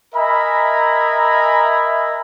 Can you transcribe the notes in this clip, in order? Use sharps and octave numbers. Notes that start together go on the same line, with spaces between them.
A#4 D#5 E5 G#5 A#5 B5